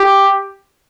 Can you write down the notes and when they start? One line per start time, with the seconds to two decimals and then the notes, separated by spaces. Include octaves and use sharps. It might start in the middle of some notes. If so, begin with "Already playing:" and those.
Already playing: G4